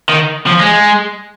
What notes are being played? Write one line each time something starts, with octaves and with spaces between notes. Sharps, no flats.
D#3
F3
G#3